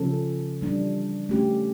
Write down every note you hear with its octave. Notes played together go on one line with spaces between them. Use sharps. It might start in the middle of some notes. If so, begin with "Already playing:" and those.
Already playing: C#3 F3 C#4 F4 A4
E3 G3 D4
A3 C#4 G4